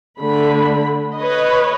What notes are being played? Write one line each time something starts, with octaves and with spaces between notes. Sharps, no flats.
D3 A3 B5
B4 C#5 D#5